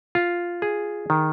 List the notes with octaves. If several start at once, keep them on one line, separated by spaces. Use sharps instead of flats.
F4
G#4
D#3